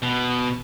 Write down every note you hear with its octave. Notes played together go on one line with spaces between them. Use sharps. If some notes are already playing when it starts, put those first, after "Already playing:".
B2